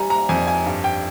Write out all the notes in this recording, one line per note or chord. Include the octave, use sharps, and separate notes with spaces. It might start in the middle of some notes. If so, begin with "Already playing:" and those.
Already playing: G3 G#5 A#5
A#5
F2 G#5
G#5
G2
G5